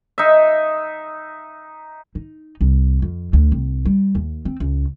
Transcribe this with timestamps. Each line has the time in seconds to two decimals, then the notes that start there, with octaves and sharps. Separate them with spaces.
0.18 D#4 E5
2.15 D#4
2.61 C2
3.02 F2
3.33 D2
3.52 C2
3.85 G3
4.15 D#2
4.45 C4
4.60 C#2